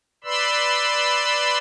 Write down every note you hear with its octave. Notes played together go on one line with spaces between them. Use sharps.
B4 D5 B5 C6 E6